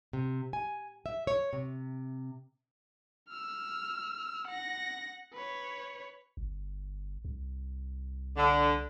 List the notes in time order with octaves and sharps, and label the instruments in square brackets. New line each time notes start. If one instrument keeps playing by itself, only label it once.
[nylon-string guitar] C3
G#5
E5
C#5
C3
[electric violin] E6 F6
F#5 A#6
B4 C#5
[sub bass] G1
C2
[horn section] D3